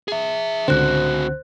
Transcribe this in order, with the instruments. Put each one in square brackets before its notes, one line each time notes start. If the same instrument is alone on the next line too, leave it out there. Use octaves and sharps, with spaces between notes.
[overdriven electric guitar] G#4 E5
[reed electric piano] C#2 D3 [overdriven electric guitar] C4 F#4 [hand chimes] C5 F#6